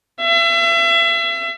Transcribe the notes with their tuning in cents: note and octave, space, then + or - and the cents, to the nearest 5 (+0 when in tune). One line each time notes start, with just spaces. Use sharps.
E5 +35